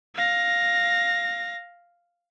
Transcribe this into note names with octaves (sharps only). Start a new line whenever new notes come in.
F5 A#6